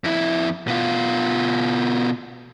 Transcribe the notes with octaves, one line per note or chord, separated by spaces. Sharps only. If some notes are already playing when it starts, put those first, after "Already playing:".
F2 E4
B2 F4